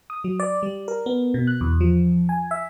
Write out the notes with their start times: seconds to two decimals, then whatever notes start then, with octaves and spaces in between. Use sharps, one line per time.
0.10 D#6
0.24 F#3
0.40 D5
0.63 G3
0.88 A#4
1.06 B3
1.34 B2
1.47 F#6
1.61 E2
1.80 F3
2.29 G#5
2.51 E5